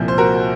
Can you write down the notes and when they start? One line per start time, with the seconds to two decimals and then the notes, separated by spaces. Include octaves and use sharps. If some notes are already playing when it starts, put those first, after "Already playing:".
Already playing: C2 A#2 F3
0.08 C5
0.18 F#4 A#4